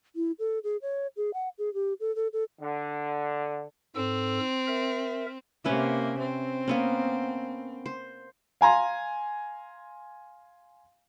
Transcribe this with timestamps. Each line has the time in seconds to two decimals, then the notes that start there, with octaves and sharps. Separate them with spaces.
0.16 E4
0.39 A4
0.64 G#4
0.82 C#5
1.17 G#4
1.34 F#5
1.58 G#4
1.74 G4
2.00 A4
2.16 A4
2.33 A4
2.60 D3
3.96 G#2 C4 A4 E6
4.67 A#4 E5
5.65 C3 A#3 C#4 B4 E5
6.19 C4
6.68 A#3 B3 C#4
7.86 C5
8.61 F5 G#5 A#5 C6